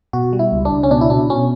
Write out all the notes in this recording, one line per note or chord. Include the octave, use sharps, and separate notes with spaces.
B2 F#4
G3
E4
C#2
D4
C#2
C#4
B2 D4
E4
B2 D4
B2 C#4